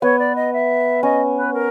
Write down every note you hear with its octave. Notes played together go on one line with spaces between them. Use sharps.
B3 C#5
D5
D#5
E5
C#4 D#5
B4
A#4